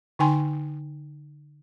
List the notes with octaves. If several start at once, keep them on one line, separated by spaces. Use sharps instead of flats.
D3 D#4 G5 G#5 C6